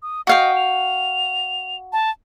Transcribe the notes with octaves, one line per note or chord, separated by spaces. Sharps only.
D#6
F#4 D#5 F5 G5
F7
A5